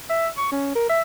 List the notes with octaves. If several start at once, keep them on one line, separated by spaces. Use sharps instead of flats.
E5
C#6
C#4
A#4
E5